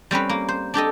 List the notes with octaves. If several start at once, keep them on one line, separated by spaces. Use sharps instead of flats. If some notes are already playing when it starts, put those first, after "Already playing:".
G3 C4 C#4 B4
A#3
C5
D4 G4 A4 D#5